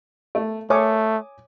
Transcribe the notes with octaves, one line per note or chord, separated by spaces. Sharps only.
A3
A3 C#5 G#5 D6 D#6